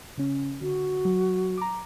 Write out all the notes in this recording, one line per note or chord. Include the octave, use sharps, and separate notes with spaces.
C#3 C#4
D3 F#4
F#3
A#5 D6